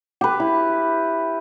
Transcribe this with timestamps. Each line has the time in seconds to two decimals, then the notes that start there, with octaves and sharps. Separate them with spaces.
0.21 G4 B4
0.40 E4